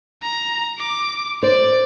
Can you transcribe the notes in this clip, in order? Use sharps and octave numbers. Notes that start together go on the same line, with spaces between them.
A#5
D6
C5 D5